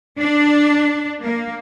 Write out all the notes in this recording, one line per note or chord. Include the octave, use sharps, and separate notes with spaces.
D4
A#3